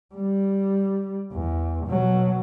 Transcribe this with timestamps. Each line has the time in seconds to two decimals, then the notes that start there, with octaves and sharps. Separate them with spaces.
0.15 G3
1.33 E2
1.87 B2 F#3